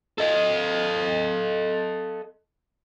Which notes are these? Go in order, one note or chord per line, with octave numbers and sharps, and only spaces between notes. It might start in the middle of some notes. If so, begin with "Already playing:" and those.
A4 D#5